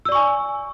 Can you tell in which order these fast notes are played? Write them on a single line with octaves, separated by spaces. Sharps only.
E6 D5 C#6 G#5